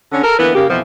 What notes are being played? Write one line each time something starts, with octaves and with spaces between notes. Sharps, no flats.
D3 C#4
A4 A#4
D3 E3 A#3 B3 E4 B4
C#3 A#3 G4
F2 B2 E3 F3